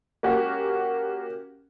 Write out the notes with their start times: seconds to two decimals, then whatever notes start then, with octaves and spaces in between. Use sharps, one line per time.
0.23 A#3 C#4 F#4 G4